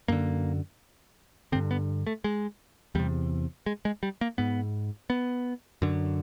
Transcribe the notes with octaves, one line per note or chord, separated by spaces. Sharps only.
F#2 D3 A#3
G2 D3 C4
B3
A3
G#3
E2 C3 G3
G#3
G#3
G3
A#3
G#2 B3
B3
F#2 D3